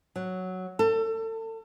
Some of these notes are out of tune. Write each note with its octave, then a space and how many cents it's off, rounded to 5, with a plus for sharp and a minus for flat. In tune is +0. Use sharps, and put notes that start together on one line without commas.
F#3 +0
A4 +30